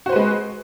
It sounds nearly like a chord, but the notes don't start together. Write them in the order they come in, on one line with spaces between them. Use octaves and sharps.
F#4 C5 B4 G#3